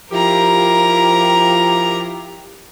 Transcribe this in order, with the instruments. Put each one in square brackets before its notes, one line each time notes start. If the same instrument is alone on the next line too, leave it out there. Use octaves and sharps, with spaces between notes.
[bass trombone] F3 [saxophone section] E4 F4 G4 [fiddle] A#4 A#5